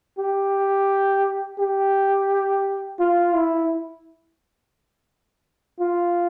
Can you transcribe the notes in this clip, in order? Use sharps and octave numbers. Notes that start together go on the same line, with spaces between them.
G4
G4
F4
E4
F4